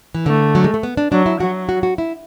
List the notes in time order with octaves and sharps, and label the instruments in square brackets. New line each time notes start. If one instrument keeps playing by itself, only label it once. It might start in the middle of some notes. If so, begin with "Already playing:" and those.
[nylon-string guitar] E3
[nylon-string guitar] D3 [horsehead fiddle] A3
[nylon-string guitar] F#3
G#3
A3
B3
D4
[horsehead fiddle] F#3 [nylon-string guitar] D4
[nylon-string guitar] E4
[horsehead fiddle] F#3 [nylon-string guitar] F#4
[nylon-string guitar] F#4
F#4
E4